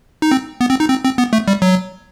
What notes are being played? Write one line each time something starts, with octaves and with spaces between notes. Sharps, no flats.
D#4
C4
B3
C4
D#4
C4
C4
B3
A3
G3
F#3